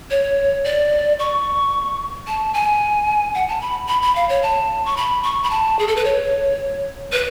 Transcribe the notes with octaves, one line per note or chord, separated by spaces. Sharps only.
C#5
D5
C#6
A5
G#5
F#5
A5
B5
B5
B5
F5
C#5
A5
C#6
B5
C#6
B5
A5
G#4
A4
B4
C#5
B4